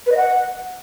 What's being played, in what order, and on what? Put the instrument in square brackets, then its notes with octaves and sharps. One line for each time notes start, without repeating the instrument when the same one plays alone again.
[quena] B4
D#5
F#5